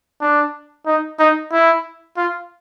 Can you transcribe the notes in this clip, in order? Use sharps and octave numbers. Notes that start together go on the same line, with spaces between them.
D4
D#4
D#4
E4
F4